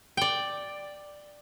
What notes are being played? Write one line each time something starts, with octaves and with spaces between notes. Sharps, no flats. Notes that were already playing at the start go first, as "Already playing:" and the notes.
D5 G5